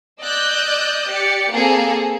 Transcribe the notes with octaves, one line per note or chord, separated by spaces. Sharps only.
D5 D#5 E6 F#6 G6
G4 D5 C#7
A#3 C4 G#4 A4